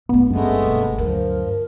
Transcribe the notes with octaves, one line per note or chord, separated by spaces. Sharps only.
G#2 A3 B3
G1 G2 G#3 A3 B3 C#4
F#1 B2
D2 F3 F#3 A#4